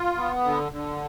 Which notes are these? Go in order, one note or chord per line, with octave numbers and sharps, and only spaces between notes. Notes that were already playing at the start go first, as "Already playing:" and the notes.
Already playing: F4
B3
D3
D3